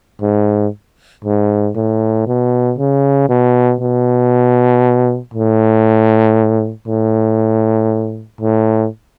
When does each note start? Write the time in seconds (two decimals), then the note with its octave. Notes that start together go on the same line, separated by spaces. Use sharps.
0.22 G#2
1.25 G#2
1.76 A2
2.27 B2
2.78 C#3
3.29 B2
3.80 B2
5.34 A2
6.87 A2
8.41 A2